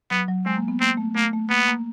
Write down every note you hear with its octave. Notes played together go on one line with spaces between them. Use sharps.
F#3 B3
F#3
G#3 C4
A#3
B3
A#3 C4
A3
A3 A#3
A3
A#3 B3
A#3